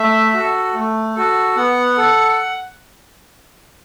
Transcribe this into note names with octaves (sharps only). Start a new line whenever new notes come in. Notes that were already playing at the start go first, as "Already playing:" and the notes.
Already playing: A3 E5
F#4 A4
A3
F#4 A4
B3 F#5
A4